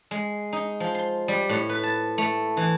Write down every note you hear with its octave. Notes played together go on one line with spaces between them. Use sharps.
G#3
D#4
F3
C6
G3
A2
B4
A5
A3
E3